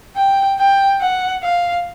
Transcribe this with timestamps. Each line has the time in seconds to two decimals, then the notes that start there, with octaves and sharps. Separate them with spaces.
0.16 G5
0.59 G5
1.01 F#5
1.43 F5